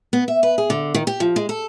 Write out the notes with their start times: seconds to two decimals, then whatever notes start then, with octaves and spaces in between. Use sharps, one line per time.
0.13 B3
0.28 E5
0.43 B4
0.58 G#4
0.70 D3
0.94 D#3
1.07 G4
1.20 F3
1.36 G#3
1.49 A4